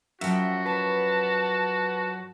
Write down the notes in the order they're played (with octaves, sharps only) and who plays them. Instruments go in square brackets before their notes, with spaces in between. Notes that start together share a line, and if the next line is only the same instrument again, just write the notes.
[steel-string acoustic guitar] F#2 F3 [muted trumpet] F#4 [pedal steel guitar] E5 F#5 G5
[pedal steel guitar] B4 C#6 [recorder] A5